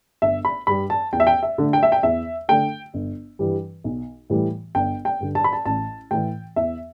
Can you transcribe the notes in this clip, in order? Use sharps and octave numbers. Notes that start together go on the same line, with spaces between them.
G1 E5
B5
G2 G3 B5
A5
E2 G5
E5
G5
E5
D3 A3
G5
E5
G5
E2 E5
D3 A3 G5
G1
G2 E3 G3
B1
A2 E3 G3
G1 G5
G5
G2 D3
A5
B5
A5
A1 A5
A2 E3 G5
E2 E5